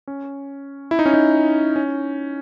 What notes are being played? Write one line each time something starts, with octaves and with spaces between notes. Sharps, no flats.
C#4
E4
D#4
C#4
D#4
C#4